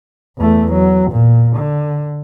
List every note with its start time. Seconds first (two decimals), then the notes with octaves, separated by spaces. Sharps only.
0.38 E2 A3
0.72 F#3
1.11 A#2
1.56 D3